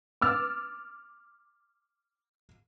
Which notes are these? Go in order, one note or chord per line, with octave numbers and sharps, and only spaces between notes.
D6 E6 F6 A6